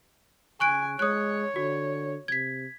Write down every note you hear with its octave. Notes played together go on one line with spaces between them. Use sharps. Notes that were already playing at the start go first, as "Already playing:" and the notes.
C#3 G#5 C#6 F#6 D7
G#3 C#5 D#6 F#6
D3 F#4
C3 G#6 B6